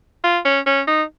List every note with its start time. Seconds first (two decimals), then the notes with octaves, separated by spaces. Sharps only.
0.24 F4
0.45 C#4
0.66 C#4
0.88 D#4